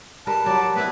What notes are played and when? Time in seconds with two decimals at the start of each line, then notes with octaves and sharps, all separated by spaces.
0.27 G3 A#4 B4 A5
0.46 F#3 G3 D5
0.76 B3 C4 E4 B4